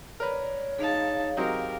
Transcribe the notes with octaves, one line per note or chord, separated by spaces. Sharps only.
A#4 B4 C#5 D5
D#4 G#4 F5 A5
F#3 C4 D#4 G4 A#4